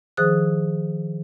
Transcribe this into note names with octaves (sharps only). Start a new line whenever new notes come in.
D#3 F3 G#4 C5 D#6 F#6